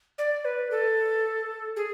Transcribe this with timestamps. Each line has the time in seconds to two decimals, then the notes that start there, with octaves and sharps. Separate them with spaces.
0.18 D5
0.45 B4
0.71 A4
1.76 G#4